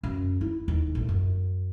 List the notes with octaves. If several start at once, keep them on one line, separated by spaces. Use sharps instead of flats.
F#2
E4
D#2
A1
F#2